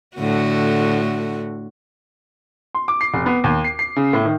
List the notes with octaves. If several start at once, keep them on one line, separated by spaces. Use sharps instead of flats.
A2 D3 F#4
C6
D6
C7
F1
B3
D#2
C7
C7
C#3
A2
D#3